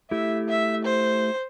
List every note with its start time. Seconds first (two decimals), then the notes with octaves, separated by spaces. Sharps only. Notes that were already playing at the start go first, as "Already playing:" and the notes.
0.11 A3 E4 G4 E5
0.49 E5
0.85 C5